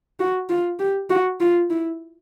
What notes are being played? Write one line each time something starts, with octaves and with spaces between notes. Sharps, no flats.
F#4
F4
G4
F#4
F4
E4